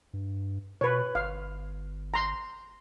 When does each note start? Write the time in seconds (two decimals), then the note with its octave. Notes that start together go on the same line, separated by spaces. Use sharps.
0.14 G2
0.81 B2 B4 C#5
1.15 G1 F5
2.14 A#5 C6